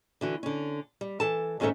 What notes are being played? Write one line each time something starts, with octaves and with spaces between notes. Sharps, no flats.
D3 E3 F#4
D3 C#4
G3
E3 A4 A5
D#2 G#2 C#4 D#4 A4 E5